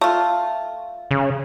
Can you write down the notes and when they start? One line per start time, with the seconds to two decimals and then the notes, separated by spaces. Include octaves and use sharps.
0.01 A3 F4
1.11 C#3